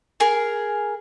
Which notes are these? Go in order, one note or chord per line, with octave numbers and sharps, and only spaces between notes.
G#4 A#4